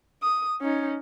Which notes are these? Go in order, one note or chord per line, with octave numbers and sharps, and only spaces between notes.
D#6
C#4 D#4